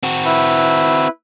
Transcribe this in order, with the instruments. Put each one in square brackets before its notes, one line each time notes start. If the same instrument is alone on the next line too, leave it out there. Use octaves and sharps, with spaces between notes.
[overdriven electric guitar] C4 F#4
[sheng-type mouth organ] E4 B4